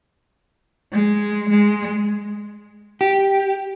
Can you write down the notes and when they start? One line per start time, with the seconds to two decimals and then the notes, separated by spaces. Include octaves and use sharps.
0.92 G#3
1.49 G#3
3.01 G4